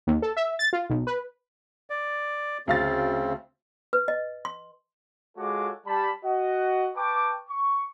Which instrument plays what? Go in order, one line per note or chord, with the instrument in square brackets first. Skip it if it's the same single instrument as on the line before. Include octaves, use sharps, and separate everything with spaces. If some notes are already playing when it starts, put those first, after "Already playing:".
[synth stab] D#2
A4
E5
A6
F4
B1
B4
[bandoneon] D5
[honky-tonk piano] D2 F5 A6 [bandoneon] C#3 C4
[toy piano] B4
D#5
C6
[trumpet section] G#3 F4 F#4 A4 C#5 D6
G3 A5 B5
F#4 D#5 F#5
B4 G5 A5 C#6 D6
C#6